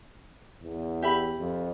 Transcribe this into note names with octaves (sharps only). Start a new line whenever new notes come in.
E2
G4 E5 B5
F2